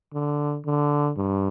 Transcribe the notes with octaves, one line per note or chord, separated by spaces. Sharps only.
D3
D3
G2